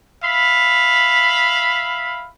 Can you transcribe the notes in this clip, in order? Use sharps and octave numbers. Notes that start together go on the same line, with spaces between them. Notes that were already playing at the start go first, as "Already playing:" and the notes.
E5 F5 B5